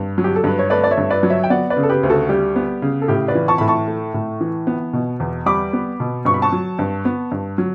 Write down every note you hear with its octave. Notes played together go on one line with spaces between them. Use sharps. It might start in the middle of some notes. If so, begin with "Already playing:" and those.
Already playing: G2
F#3
G4
A4
G2 B4
C#5
A3 B4 D5
D5
C#5 E5
G2
B4 D5
F#3
C#5 E5
G5
B3 D5 F#5
B4 D5
C#3
A4
G4 B4
D2
F#4 A4
G3 G4
B3
C#3
A4
A2 G4
B4 D5
E3
A5 C#6
A2 B5
A5 C#6
A3
A2
E3
B3
B2
E2
G3 B5 D6
B3
B2
G2 C#6
B5
A5 C#6
F#3
G2
B3
G2
F#3